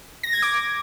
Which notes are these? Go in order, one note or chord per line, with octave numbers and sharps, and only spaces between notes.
A#6
G#6
D6